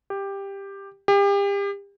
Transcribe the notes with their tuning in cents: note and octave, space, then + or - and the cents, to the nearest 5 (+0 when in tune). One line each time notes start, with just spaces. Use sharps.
G4 +10
G4 +35